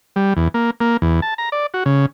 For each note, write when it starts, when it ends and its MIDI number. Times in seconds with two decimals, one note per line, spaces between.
0.16 0.33 55
0.37 0.48 40
0.54 0.70 58
0.81 0.97 58
1.02 1.20 40
1.22 1.34 81
1.38 1.49 82
1.52 1.66 74
1.74 1.84 66
1.86 2.06 49